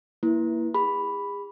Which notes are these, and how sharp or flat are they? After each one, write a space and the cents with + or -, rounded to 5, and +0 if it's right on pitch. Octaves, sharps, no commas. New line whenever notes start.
A#3 +0 E4 +0 B4 -25
G#4 -40 B5 +0